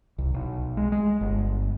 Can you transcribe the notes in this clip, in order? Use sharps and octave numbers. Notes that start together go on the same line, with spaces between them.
C2
B1
G#3
G#3
G1